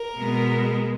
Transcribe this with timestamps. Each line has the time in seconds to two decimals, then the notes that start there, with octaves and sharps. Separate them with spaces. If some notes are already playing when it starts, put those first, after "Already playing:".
Already playing: A#4
0.17 B2 G#3 B3